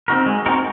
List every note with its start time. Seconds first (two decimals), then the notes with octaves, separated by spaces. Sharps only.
0.08 C4 D#4 F#4 A#4
0.26 G#3
0.46 C4 D#4 F#4 A#4